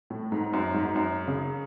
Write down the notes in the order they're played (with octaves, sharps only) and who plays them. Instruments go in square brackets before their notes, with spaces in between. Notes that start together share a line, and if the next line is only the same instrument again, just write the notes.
[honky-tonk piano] A2
G#2
F#2
G#2
F#2
C#3